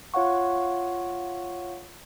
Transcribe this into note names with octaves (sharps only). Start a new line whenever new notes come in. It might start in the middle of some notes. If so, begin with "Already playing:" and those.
F4 C#5 F5 F#5 C#6